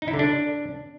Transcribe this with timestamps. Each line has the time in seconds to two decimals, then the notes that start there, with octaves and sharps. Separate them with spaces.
0.02 D#4
0.08 E4
0.14 D3
0.19 D4